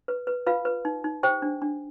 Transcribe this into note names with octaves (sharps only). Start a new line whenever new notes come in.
B4
B4
F4 B4 F5
B4
D#4
D#4
G4 C5 G5
D4
D4